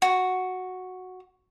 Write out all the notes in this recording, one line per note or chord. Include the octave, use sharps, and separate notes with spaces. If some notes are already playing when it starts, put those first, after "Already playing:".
F#4